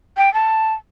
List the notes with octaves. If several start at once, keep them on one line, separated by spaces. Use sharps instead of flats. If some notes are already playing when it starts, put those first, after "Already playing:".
G5
A5